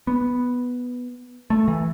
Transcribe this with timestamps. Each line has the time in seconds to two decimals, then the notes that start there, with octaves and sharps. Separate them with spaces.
0.07 B3
1.50 A3
1.68 E3